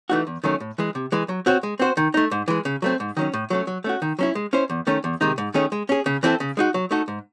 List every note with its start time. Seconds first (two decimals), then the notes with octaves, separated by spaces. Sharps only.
0.10 E3 A3 D#4 F#4
0.27 E2
0.44 D#3 F#3 A3 C#4
0.60 A2
0.78 E3 G#3
0.95 C3
1.12 E3 G#3
1.29 F#3
1.46 C4 F#4 C#5
1.63 G#3
1.79 C4 F#4 C5
1.97 D#3
2.14 A3 D#4
2.31 G#2
2.48 E3 G#3
2.65 C#3
2.82 F#3 A3 C4
3.00 G#2
3.17 D#3 F#3 C#4
3.34 A2
3.50 F#3 A3 C#4
3.67 F#3
3.84 A3 C#4 F#4
4.02 D#3
4.19 F#3 C#4 E4
4.35 G#3
4.53 C#4 E4 C5
4.70 E2
4.87 D#3 A3 C#4
5.04 E2
5.21 C3 D#3 G#3 D#4
5.38 G#2
5.54 D#3 A3 C#4 G#4
5.72 G#3
5.89 C#4 G#4
6.06 C#3
6.23 E3 C4 E4 A4
6.40 C#3
6.57 G#3 D#4 F#4
6.74 F#3
6.91 A3 D#4 F#4 A4
7.08 G#2